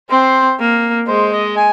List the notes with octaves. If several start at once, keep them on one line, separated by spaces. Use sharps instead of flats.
C4 C5
A#3
G#3 C5
D#5
G#5